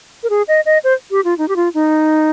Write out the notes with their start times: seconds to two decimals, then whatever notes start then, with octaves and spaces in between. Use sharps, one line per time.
0.23 A#4
0.30 G#4
0.48 D#5
0.66 D#5
0.84 C5
1.11 G4
1.25 F4
1.38 D#4
1.48 G4
1.56 F4
1.74 D#4